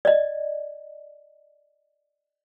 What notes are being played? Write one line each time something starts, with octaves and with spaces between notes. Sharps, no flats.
D5 D#5